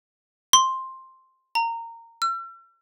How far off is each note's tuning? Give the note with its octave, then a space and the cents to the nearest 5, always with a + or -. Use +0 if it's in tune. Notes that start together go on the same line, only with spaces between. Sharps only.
C6 +5
A#5 -20
E6 +45